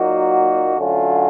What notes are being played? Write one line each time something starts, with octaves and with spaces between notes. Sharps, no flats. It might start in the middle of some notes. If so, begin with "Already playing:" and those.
Already playing: A#2 F#3 A#3 D#4 F#4
D3 F#3 A3 C#4 F4